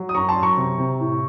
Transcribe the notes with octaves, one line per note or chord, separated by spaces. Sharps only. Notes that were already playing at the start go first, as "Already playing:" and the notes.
Already playing: F#3
D#6
F#2 A#5 C#6
A5 C6
F#2
A#5 C#6
C3
C3
A2